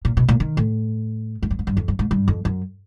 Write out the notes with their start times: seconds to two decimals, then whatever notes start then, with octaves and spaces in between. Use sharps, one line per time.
0.05 A#2
0.17 B2
0.29 A#2
0.40 D#3
0.57 A2
1.43 G#2
1.51 G2
1.59 G#2
1.67 G2
1.77 F2
1.88 G2
1.99 G#2
2.11 G2
2.28 F2
2.45 F#2